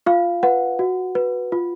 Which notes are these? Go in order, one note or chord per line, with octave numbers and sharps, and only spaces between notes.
F4 F5
B4 F#5
F#4
B4
F4